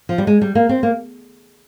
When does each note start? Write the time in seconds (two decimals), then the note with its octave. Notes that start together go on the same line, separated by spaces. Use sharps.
0.09 F3
0.18 G3
0.27 G#3
0.42 G3
0.55 A#3
0.69 C4
0.83 A#3